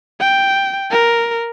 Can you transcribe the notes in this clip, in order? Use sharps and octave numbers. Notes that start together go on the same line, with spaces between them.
G5
A#4